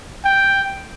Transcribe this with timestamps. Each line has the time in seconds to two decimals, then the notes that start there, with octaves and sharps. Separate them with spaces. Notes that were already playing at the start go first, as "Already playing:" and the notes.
0.25 G5